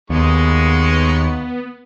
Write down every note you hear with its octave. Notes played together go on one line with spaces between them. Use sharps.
D#2 G#3 B3 D#4 C#6